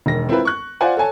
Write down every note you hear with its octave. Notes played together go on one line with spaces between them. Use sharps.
E1 D#3 A#6
C4 E4 F4 A#4 B4
C#6 F#6
F4 C5 D5 F5 F#5 G#5
A4 C#5 G#5 A5